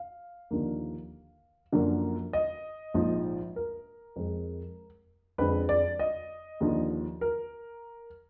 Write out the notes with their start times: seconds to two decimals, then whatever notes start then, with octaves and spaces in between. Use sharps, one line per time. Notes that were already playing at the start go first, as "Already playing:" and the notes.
Already playing: F5
0.51 D#2 D3 F3 A#3
1.72 F#2 D3 F3 A#3
2.33 D#5
2.94 A#1 G#2 F3
3.56 A#4
4.16 F2 F3 G#3
5.38 F2 D3 G#3 B4
5.69 D5
5.99 D#5
6.61 D#2 D3 F3
7.21 A#4